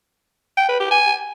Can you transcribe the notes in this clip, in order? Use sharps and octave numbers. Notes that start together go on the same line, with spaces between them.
G5
B4
G4
G#5